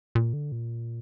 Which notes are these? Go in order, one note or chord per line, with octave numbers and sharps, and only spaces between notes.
A#2
D3
A#2